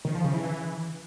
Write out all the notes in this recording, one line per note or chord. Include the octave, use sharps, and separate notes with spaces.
D#3
F3
C#3
E3